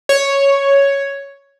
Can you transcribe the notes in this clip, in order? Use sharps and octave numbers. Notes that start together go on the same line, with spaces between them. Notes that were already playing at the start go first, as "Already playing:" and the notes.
C#5